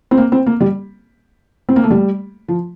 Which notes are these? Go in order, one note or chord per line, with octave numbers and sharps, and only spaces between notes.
C4
A#3
C4
A#3
G3
C4
A#3
A3
G3
F3